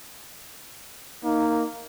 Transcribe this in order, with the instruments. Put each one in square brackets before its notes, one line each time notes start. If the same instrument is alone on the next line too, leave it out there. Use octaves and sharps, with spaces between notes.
[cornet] A#3 [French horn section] D#4